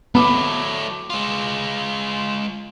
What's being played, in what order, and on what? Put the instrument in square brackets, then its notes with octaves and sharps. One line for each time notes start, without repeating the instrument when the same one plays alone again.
[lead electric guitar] F#3 A3 [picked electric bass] B3 [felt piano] B5 D6
[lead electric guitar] G#3 F4